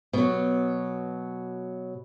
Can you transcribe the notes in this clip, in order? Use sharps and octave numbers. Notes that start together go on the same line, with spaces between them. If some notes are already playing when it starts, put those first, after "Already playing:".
B2 F#3